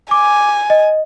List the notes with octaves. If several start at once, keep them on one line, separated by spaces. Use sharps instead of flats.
G#5 D6
D#5